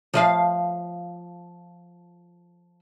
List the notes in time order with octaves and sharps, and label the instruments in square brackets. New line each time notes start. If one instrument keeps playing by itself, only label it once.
[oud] F3 D#5 F5